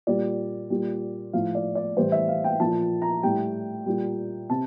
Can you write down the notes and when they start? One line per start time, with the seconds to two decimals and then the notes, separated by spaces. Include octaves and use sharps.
0.07 A#2 G3 D5
0.70 A#2 G3
1.33 A2 F3 F5
1.55 D5
1.75 D5
1.97 A2 E3 G3 C5
2.12 E5
2.28 F5
2.44 G5
2.60 A#2 F3 A5
3.02 A#5
3.23 A2 G3 G5
3.86 A#2 G3
4.50 C3 A5